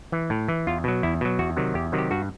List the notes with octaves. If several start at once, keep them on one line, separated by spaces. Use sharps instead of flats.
E3
A2
E3
E2 F4
B2 F#3
E2 E4
B2 F#3
E2 F#4
C3 D#3 F#3
E2 G4
C3 D#3 F#3
G4
G2 F#4